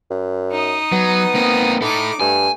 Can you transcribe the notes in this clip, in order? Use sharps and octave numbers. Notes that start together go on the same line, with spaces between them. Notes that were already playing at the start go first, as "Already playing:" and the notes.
F#2
D#4 D#6
F#3 B3
A#3 C4
D#4 E4 A4 D6
G2 A3 G#5